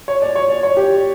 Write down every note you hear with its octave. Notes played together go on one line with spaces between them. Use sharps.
C#5
D5
C#5
D5
C#5
G4